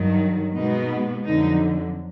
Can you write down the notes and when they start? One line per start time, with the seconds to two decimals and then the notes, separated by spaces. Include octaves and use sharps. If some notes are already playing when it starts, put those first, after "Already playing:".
Already playing: G2 D#3 F#3
0.55 B2 G#3 B3 D#4
1.24 F2 D3 F#3 D#4